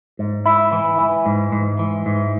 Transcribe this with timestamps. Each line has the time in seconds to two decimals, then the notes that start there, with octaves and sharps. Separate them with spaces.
0.19 G#2
0.46 E4
0.72 E3
0.99 E3
1.26 G#2
1.52 G#2
1.79 E3
2.06 G#2